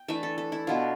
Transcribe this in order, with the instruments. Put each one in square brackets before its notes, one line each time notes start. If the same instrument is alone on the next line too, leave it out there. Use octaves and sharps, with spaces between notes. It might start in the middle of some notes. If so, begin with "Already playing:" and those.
Already playing: [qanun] G5
E3 A3 D4 E5
A4
A4
E4
B2 B3 D4 F4